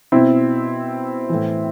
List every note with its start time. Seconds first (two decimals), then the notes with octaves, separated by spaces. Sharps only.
0.12 B2 C4 E4
1.29 A2 E3